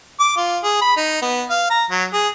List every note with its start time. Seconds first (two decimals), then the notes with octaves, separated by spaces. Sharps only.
0.20 D6
0.37 F4
0.64 G#4
0.82 B5
0.97 D#4
1.22 B3
1.50 F5
1.70 A#5
1.90 F#3
2.13 G#4